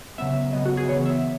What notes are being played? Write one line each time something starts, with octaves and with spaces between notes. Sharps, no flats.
C#3 F#3 B3 E5
C#3 F#3 B3 D#5
F#4
G#4
C#3 E3 B3 C#5
E5